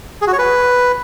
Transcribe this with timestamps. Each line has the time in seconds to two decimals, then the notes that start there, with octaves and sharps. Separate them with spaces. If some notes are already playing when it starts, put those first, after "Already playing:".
0.22 G#4
0.27 F#4
0.33 C#5
0.38 B4